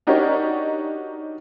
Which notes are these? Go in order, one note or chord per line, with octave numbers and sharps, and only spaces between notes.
D4 D#4 F#4 G4 A#4 C#5